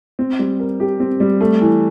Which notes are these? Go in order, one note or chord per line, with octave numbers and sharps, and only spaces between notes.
C4
G3
A#4
G4
C4
G3
A3
E3